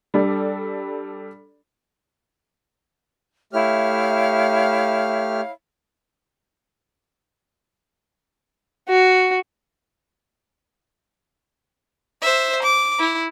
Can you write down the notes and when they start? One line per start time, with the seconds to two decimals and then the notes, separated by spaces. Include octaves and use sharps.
0.14 G3 D4 A4 D5
3.53 A3 E4 G4 C#5 F5 F6
8.89 F#4
12.22 C5 E5
12.63 D6
12.99 E4